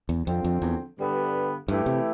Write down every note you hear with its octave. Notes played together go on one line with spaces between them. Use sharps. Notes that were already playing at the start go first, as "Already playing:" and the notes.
E2
F2 D3 F3 C4
F2
E2
G2 D3 G3 B3
G2 E3 A3 E4 G4
C3